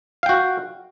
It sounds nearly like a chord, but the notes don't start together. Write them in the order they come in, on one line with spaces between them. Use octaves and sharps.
F5 G5 F#4